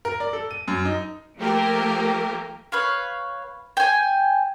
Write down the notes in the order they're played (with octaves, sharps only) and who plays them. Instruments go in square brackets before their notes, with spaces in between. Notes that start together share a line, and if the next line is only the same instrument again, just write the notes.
[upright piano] A#4
D5
A4
D#7
F#2
D#4
[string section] F3 A3 A#3 G4 A#4
[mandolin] B4 C#5 F5
G5 G#5